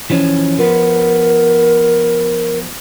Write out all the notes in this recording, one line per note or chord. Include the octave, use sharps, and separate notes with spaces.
E3 F3 C#4
F3 B3 A#4